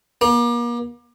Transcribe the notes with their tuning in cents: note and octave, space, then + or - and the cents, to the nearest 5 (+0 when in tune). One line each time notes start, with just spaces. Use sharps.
A#3 +40